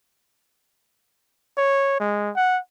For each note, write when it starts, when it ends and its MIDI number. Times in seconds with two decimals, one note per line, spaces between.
1.57 1.97 73
2.00 2.31 56
2.36 2.59 78